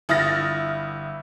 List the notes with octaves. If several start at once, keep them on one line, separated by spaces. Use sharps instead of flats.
G1 E4 D#6 F6 A6 A#6